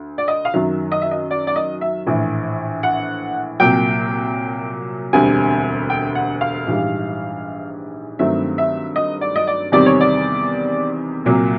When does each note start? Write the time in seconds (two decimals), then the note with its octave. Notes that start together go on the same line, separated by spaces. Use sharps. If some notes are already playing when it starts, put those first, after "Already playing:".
Already playing: D2
0.18 D5
0.28 D#5
0.45 F5
0.54 F#2 D#3 F#3 E5
0.92 D#5
1.02 E5
1.11 D#5
1.31 D5
1.47 D5
1.56 D#5
1.81 E5
2.07 A#1 A2 E3
2.83 F#5
3.60 C2 A#2 F#3 G5
5.13 E1 D2 D3 G3 C4 G#5
5.90 G5
6.15 F#5
6.41 F5
6.66 A#1 G#2 E3 G3
8.19 G2 D#3 F#3 A3 C4 E5
8.58 E5
8.96 D#5
9.21 D5
9.36 D#5
9.47 D5
9.72 E2 C3 D#3 G3 C4 D5
9.86 C#5
10.01 D5
11.25 C2 A#2 F#3